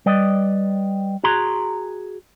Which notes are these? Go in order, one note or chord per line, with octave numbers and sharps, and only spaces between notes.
G3 B4 D5 D#5
F#4 G#4 A#5 C6